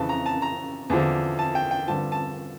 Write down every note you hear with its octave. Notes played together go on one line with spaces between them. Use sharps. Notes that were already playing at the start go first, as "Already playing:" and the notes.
Already playing: F2 C#3 E3 A5
A#5
A5
A#5
E2 D3 F3
A5
G5
G5
G2 D3 F3 A5
A5